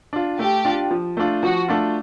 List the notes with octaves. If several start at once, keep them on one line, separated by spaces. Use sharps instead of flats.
D4 F4
A3 G4
D4 F4
F3
A3 D4 F4
F3 F#4
A3 D4 F4